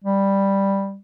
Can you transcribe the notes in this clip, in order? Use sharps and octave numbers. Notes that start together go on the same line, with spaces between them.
G3